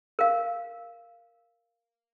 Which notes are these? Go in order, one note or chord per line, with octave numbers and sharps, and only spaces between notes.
A#4 F5